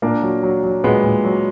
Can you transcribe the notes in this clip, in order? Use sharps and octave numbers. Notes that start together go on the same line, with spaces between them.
A#2 A#3 D4
F#3
F#3
F#3
A#2 G#3 B3
A#2
F#3